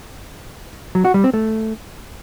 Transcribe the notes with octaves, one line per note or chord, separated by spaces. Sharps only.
F#3
F#4
G3
C4
A3